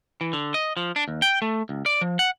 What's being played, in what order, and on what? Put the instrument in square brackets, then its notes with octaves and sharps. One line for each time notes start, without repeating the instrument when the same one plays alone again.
[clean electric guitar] E3
D3
D#5
F3
D4
D#2
G5
A3
C#2
D5
F3
F#5